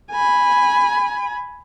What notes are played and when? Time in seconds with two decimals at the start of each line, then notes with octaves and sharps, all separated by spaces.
0.11 G#5 B5